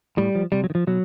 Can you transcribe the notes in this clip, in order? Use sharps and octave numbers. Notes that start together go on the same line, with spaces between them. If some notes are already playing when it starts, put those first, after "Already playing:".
A2 G3
F3
C3 G3
F#3
D#3
F3
B2 F#3